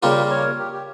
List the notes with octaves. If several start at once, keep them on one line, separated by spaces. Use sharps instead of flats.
C#3 G3 A#3 F4 G4 A#4
A#4 C#5
G4 A#4
G4